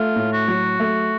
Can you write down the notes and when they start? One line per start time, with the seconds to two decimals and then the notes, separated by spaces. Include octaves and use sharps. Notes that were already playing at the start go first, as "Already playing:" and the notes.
Already playing: A3 F4
0.16 A2
0.33 F#4
0.48 F#3
0.80 A3